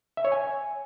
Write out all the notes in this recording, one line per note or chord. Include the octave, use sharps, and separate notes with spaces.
E5
C#5
G#5